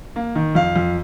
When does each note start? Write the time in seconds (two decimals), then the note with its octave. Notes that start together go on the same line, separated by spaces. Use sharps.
0.16 A#3
0.35 D#3
0.55 F2 F5
0.76 F2